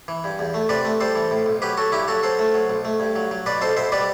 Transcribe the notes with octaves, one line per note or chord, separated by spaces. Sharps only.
E3
G2
E2
A3
C3 B4 D5
A3
G3 A4 C5
E3
A2
B1
F#3 G4 B4
F#3 F#4 A4
G2 E4 G4
F#3 F#4 A4
F#3 A4 C5
A3
F#3
B1
A3
G2
F#3
F#3
B2 B4 D5
B1 A4 C5
B2 C5 E5
G3 B4 D5